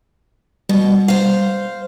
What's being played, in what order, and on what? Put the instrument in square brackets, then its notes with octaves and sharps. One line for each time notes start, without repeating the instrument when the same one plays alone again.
[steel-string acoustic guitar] B2 [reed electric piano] G3
[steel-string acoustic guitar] C5 F5